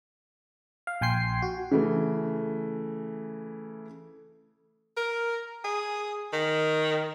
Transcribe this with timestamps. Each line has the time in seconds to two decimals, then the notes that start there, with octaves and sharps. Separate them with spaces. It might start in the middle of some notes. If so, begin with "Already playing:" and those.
0.87 F5
1.01 A#1 G5 G#5 C6 C7
1.42 F#4
1.71 C#3 E3 A3
4.97 A#4
5.64 G#4
6.33 D#3